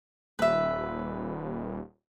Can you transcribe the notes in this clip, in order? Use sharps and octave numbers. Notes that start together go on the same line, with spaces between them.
D#1 B4 E5